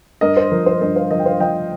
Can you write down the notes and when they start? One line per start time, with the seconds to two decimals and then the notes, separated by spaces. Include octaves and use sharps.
0.21 G2 A#4 D#5
0.37 C5
0.52 F3 A#4
0.66 C5
0.81 G2 A#4 D#5
0.96 C5 F5
1.11 F3 A#4 D#5
1.19 G5
1.26 C5 F5
1.40 F3 D#5 G5